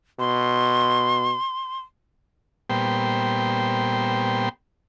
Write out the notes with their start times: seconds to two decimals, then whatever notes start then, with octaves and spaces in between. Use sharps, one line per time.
0.20 B2 C6
2.70 A#2 G3 B3 C5 G5